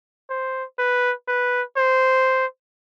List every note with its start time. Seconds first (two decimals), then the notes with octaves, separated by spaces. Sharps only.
0.30 C5
0.78 B4
1.28 B4
1.77 C5